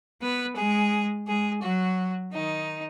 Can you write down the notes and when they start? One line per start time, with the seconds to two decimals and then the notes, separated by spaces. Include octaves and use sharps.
0.22 B3 B4
0.56 G#3 G#4
1.27 G#3 G#4
1.63 F#3 F#4
2.33 D#3 D#4